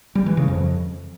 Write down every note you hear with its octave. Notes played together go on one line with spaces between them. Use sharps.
G3
E3
C#3
F2